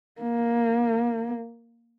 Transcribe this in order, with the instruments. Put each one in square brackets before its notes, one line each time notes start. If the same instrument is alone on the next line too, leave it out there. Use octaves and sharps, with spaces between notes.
[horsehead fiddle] A#3